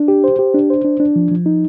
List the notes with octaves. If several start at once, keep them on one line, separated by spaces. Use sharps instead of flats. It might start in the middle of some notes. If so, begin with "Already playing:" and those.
Already playing: D4
G4
C5
G4
D4
C5
D4
D4
F3
F3
D#4